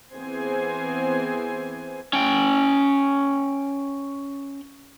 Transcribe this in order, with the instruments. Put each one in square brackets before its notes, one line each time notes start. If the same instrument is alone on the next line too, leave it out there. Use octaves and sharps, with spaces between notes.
[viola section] E3 B3 C4 G#4 C5 G#5
[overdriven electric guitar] C#4 G5